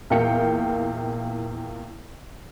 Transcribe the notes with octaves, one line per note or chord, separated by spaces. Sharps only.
E2 A#2 E4 F5 G5 C#7